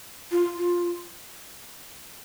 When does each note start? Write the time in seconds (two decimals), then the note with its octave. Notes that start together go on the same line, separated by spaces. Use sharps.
0.31 F4
0.57 F4